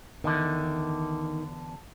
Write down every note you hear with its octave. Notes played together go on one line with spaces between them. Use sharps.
E2 D3 D#3